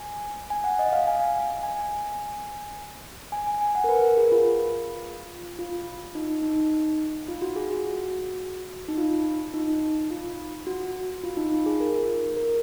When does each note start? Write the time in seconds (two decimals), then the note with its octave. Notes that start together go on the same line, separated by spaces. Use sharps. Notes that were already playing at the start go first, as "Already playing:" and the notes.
Already playing: G#5
0.50 G#5
0.64 F#5
0.79 D#5
0.93 F5
1.07 G#5
1.63 G#5
3.32 G#5
3.47 G#5
3.61 G#5
3.75 F#5
3.84 A#4
3.89 B4
4.03 A#4
4.17 G#4
4.32 F4
5.59 F4
6.15 D#4
6.42 D#4
7.29 F4
7.42 F#4
7.56 G#4
7.71 F#4
8.88 D#4
8.98 F4
9.54 D#4
10.11 F4
10.67 F#4
11.24 F4
11.37 D#4
11.52 F4
11.66 G#4
11.80 A#4
12.37 A#4